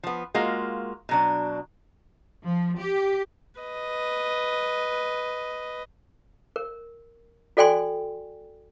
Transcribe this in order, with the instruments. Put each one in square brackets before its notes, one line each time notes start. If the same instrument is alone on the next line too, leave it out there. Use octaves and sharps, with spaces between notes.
[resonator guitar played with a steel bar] F3 B3
G#3 A#3 F4 F#4
B2 F#3 D4
[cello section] F3
G4
[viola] B4 D#5
[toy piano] A#4
F#4 A4 D5 G5 G#5 C6